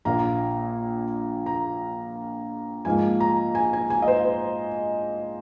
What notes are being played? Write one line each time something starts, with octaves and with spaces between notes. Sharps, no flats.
A#1 A#2 A#3 A#5
A#5
G#2 F3 A#3 G#5
A#5
G#5
G#5
G#5
D#5
C5
C5